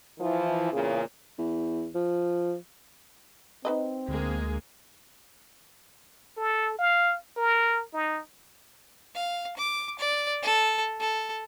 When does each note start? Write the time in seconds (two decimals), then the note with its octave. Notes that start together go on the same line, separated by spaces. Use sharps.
0.19 E3 F3
0.71 E2 A#2 C#3
1.38 E2
1.95 F3
3.65 C4 D#4 B4 D#5
4.08 D2 G#3 A#3 G#4
6.37 A4
6.79 F5
7.37 A#4
7.94 D#4
9.15 F5
9.57 D6
9.99 D5
10.42 A4
11.00 A4